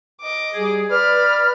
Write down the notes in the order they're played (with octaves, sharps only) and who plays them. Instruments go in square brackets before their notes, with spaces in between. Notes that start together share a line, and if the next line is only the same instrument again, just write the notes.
[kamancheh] D#5 D6
[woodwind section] G3 G4 G#4
[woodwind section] B4 D5 [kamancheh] B5 F6